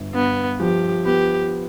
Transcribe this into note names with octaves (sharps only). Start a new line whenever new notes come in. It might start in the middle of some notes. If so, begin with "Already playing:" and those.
Already playing: G1
G2 B3
F3 G4
B3 G4